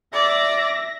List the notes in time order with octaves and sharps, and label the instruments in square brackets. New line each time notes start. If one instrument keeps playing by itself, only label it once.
[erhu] D5 [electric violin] E5 A#6